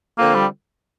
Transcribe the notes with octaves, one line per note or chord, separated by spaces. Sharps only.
D3 F3 A#3 C4 F4 A4
G3